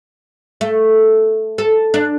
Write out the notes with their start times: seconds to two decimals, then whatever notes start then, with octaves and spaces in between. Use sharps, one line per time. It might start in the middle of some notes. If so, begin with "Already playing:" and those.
0.61 A3
1.58 A4
1.94 D4